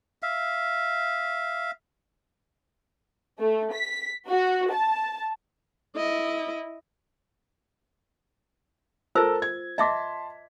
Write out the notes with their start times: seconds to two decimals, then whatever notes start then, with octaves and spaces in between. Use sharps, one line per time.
0.23 E5 F5
3.39 A3
3.73 B6
4.28 F#4
4.72 A5
5.96 E4 D#5
9.15 F4 A4 A#4 C5 A5 E6
9.42 G#6
9.78 D#5 E5 A5 C6 D6 B6